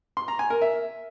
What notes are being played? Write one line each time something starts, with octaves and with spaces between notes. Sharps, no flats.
C6
A#5
G#5
A#4
E5